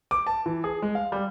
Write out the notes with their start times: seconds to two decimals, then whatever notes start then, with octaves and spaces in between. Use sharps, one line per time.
0.11 D6
0.27 A5
0.46 E3
0.64 G#4
0.82 G#3
0.95 F5
1.12 G3